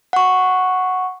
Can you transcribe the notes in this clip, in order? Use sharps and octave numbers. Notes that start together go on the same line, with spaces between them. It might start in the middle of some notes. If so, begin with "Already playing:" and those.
F#5 C#6